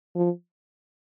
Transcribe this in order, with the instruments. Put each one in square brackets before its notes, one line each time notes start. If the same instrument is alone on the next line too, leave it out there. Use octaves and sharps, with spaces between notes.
[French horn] F3